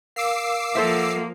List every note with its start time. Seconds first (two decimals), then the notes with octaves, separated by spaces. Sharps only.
0.16 A#4 F5 D6 E6 C7
0.75 F3 A#3 A4 C5 E5 F#5